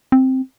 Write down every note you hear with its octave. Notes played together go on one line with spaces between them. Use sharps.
C4